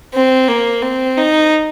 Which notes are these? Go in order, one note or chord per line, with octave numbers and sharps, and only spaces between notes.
C4
A#3
C4
D#4